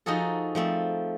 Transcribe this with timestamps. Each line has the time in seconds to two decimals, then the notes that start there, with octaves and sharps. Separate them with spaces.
0.06 F3 D#4 F#4 G#4 A4
0.55 F3 A3 C4